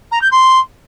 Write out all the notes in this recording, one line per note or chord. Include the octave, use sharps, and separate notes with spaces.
A#5
G6
C6